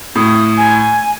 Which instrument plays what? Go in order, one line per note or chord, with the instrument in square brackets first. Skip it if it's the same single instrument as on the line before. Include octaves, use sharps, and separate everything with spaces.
[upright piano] A2 [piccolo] D#6
[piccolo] G#5